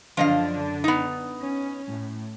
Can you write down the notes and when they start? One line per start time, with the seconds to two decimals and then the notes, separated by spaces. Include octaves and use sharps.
0.17 F#2 D3 F3 D4 D#5 F5
0.84 B3 D#4
1.41 C#4
1.89 A2